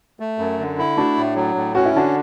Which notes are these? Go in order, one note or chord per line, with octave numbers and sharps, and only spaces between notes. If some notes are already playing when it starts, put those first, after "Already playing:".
A3
F#2
D3
E4
A3 D4 F#4
A2
F#3
A2
C#4 F#4
E4
D3 D4 F#4